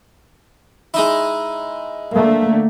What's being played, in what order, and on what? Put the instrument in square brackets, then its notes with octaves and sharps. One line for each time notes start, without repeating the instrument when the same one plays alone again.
[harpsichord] G#3 D#4 E4
[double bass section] D3 A3 A#3